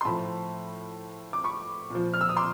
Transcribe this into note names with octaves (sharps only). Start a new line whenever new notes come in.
C6
A2 F3 A5 B5
D6
B5 C#6
A#2 F3
F6
E6
D#6
C6 D6